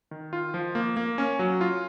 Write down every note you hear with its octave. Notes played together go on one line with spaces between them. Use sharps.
D#3
F4
F3
A#3
A#3
C#4
F#3
F4